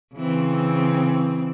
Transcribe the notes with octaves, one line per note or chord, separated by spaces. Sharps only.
C#3 E3 C4